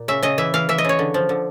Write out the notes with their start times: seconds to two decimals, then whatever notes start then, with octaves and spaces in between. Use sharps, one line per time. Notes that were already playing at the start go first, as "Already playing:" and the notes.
Already playing: A#2
0.08 C#3 E5
0.23 C#3 D#5
0.38 E3 E5
0.54 E3 F5
0.69 E3 E5
0.78 D#5
0.85 C#3 C#5
0.99 D3
1.14 F3
1.29 D3